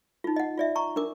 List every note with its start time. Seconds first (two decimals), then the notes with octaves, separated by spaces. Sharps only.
0.24 D#4 F4
0.36 D#5 F#5
0.57 F4 D5 E5
0.76 A#5 C#6
0.96 D4 A#4 D6